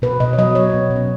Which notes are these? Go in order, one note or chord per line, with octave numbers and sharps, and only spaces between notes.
B2 B4
B2 D#5
C#5
F#3 D#5
F#3 C#5
B2 B3
B2
C#4